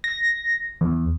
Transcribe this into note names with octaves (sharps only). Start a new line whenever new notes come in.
A#6
E2